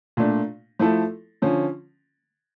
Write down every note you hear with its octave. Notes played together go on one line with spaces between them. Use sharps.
A#2 A3 D4
F3 A3 E4 A4
D3 F3 C#4